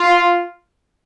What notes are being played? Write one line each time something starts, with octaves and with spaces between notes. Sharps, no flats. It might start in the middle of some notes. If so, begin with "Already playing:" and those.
Already playing: F4